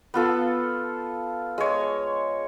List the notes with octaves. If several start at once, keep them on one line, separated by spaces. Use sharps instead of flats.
B3 F4 A4
G#3 C#5